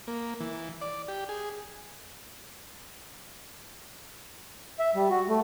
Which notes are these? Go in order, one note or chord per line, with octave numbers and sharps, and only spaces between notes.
A#3
E3
D5
G4
G#4
E5
G3
F#4
A3